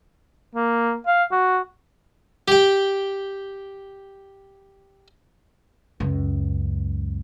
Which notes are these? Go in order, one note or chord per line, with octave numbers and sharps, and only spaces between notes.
A#3
F5
F#4
G4 G5
C#2 F#2